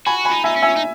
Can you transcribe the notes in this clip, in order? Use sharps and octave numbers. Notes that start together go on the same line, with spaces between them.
F#4 G#5 B5
G#5 B5
D#4
D#4 E5 G#5
C#4
E5 G#5
D#4